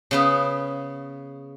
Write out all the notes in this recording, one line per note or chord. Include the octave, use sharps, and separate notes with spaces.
C#3 B3 B4